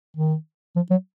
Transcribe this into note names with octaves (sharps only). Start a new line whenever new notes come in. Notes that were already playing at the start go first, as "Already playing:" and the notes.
D#3
F3
F#3